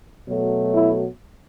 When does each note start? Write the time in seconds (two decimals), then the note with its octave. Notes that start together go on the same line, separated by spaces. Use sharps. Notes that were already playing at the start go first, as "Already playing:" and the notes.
0.26 B2 F#3 A3
0.75 E4